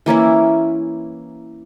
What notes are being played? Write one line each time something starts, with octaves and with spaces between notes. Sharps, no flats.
E3 A#3 C#4 E4